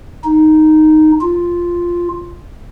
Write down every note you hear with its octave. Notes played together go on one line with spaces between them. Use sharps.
D#4
F4